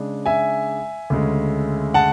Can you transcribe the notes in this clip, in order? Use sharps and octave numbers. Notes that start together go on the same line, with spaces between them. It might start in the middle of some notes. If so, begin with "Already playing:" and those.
Already playing: C#3 G#3 D4
E5 G#5
D2 C#3 G#3
F#5 A5